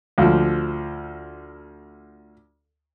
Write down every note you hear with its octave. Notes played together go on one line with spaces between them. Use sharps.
D2 F3